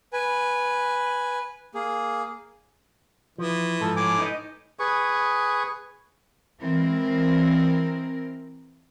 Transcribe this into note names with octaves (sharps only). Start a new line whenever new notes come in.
B4 G#5
A#3 G#4
E3 F3
G#2 F3 A4
A2 G#5 D6
D#4 B4 D#5
G#4 B4 C#6
E3 G#3 C4 A#4